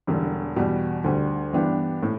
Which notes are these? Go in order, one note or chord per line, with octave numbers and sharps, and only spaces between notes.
E1 E2 D3 G3
E2 B2 G3
D2 D3 G3
G2 E3 B3 D4 G4
A2